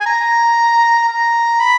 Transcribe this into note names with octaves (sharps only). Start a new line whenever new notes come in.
G#5
A#5
A#5
B5